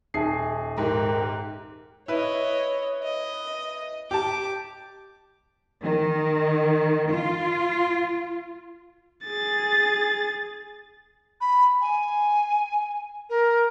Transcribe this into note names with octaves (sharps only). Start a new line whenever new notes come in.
D#1 D#4 G#4 E5 A5 C7
G#2 G4 A#4
E4 B4 C#5 D#5
D#5
G4 A5 D6
D#3
F4
G#4 A6
B5
G#5
A#4